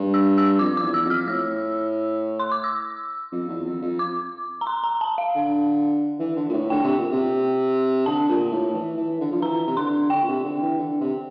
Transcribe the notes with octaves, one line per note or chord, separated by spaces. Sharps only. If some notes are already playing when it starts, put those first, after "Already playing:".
Already playing: G2
E6
E6
F2 D6
D6
E2
E6
F2 F6
A2 E6
C6
D6
E6
F2
E2
F2
F2
D6
A#5
C6
A#5
A5
F5
D3
E3
D3
A#2
A2
D3 G5
C3
A#2
C3
D3 A5
A#2
A2
E3
E3
D3
F3
E3 A#5
C3
D3 C6
D3 G5
A#2
C3
D3
E3
D3
C3